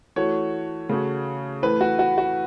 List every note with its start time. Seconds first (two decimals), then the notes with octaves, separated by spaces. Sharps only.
0.16 E3 A3 F#4 C#5
0.89 C#3 A3 F#4
1.62 A2 E3 A3 B4
1.81 F#4
1.99 F#4
2.18 F#4